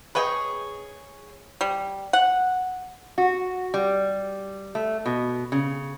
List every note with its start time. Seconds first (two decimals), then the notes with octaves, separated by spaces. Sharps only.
0.15 G#4 B4 C#5 D#5 G5
1.61 G3
2.13 F#5
3.18 F#4
3.74 G3
4.75 A3
5.06 B2
5.52 C#3